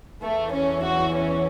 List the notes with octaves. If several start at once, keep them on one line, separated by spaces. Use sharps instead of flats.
E2 E3 A3
C#4
F#4
C#4